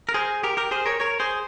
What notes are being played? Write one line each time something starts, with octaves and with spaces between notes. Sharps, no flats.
A#4
G#4 C5
G4 A#4
G4 A#4
G#4 C5
A#4 C#5
A#4 C#5
G#4 C5